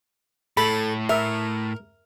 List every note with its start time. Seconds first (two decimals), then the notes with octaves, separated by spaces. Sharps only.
0.57 A2 A4 B5
1.09 A#4 E5